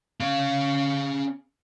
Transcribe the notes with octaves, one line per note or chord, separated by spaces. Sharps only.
C#4 F5